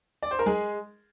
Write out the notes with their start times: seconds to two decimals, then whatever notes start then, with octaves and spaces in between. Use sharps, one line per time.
0.23 D5
0.31 C5
0.39 A#4
0.46 G#3 G#4